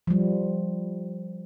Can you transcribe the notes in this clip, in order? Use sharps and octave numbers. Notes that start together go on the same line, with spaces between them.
F3 G3